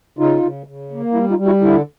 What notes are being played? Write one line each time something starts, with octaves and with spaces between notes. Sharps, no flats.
C#3 D#4 F4
C#3
C#3
A#3
G3 E4
D#4 F4
G3
E4 F#4
D3 E4